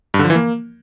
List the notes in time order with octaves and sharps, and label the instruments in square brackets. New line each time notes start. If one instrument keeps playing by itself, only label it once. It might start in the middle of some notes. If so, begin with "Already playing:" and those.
[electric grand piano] G2
D3
F3
E3
A#3